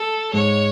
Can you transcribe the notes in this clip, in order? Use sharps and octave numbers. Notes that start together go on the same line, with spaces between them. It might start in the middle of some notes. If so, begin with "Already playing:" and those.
Already playing: A4
G#2 G#3 C#5